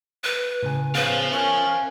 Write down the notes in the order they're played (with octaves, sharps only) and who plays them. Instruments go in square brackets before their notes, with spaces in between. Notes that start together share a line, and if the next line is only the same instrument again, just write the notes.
[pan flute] B4
[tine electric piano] A2 C#3 G#5
[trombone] C#3 [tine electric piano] B3 C#4 [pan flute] B4 [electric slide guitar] C5 F5
[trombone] C#4 [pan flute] A#4 [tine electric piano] E5 C#6 F#6